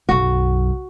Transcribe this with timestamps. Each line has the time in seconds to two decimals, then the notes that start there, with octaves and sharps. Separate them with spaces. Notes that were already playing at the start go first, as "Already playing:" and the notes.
0.09 B1 F#2 F#4